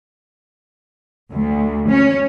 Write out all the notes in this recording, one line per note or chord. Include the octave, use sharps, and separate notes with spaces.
D2
C#4